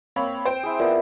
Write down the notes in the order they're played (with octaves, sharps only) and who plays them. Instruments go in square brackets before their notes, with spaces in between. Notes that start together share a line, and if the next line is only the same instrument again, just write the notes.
[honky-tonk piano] A#3 C#5 B5 [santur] C4
[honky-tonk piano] C5 G5
[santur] E4 G#4
[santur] B3 [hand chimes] F4 A#4 D5